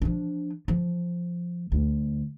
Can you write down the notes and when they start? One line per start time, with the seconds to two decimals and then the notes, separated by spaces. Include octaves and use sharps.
0.02 F3 D4
0.68 F3
1.72 D2